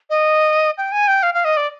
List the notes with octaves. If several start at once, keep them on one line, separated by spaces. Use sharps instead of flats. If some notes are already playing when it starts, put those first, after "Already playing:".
D#5
G5
G#5
G5
F5
F5
D#5
D5